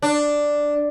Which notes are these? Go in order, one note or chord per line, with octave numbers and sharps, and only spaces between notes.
D4